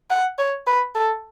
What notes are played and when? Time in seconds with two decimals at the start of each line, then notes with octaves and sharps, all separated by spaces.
0.10 F#5
0.38 C#5
0.67 B4
0.95 A4